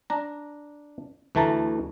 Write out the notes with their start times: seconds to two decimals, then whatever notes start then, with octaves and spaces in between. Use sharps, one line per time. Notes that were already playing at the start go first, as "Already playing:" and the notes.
0.10 D4 A#5
1.35 D2 E3 A3 A5 A#5